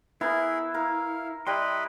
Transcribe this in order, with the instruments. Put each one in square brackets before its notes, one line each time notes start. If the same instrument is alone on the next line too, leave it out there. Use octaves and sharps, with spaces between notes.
[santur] B3 [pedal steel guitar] E4 [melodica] G#4 A#4
[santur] A#4 [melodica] F5
[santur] G3 G5 [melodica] E4 B4 D#5 [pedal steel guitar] C6